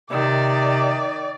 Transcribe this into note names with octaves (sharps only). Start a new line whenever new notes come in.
C3 D#3 D5